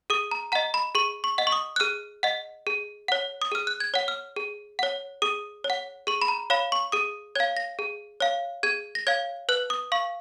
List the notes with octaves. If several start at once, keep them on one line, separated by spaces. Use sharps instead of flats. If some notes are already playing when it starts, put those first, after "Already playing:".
G#4 D#6
A#5
D#5 F#5 A#5
B5
G#4 C#6
C#6
D#5 F#5
C#6
D#6
F#6
G#4 F6
D#5 F#5
G#4
C#5 F#5
D#6
G#4 F6
F#6
G#6
C#5 F#5
F6
G#4
C#5 F#5
G#4 D#6
C#5
F#5
G#4 C#6
B5
A#5
C#5 F5 B5
C#6
G#4 D#6
C#5 F5 G#6
A#6
G#4
C#5 F5
G#4 G#6
A#6
C#5 F5 G#6
B4 F#6
D#6
F5 C#6